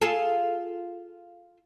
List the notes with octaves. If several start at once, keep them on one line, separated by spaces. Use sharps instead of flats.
F4 G#4 A4